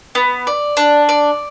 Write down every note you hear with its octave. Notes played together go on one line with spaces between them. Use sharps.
B3
D5
D4
D5